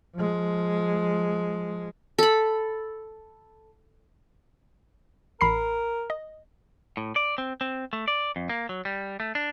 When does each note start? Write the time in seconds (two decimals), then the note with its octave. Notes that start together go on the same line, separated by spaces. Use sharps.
0.15 F3 G#3
2.19 A4 B5
5.41 A1 A#4 B5 C7
6.10 D#5
6.97 A2
7.16 D5
7.38 C4
7.61 C4
7.93 A3
8.08 D5
8.36 F2
8.50 A#3
8.69 F#3
8.85 G3
9.20 A3
9.35 D4